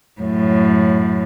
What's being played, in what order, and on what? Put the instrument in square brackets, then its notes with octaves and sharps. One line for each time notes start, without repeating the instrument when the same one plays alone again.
[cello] F#2 A2